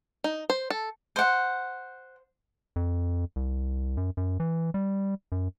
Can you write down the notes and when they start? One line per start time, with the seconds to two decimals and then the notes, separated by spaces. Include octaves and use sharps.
0.24 D#4
0.50 C5
0.70 A4
1.16 C5 F#5
2.76 F2
3.36 C2
3.97 F#2
4.17 F#2
4.40 E3
4.74 G3
5.32 F#2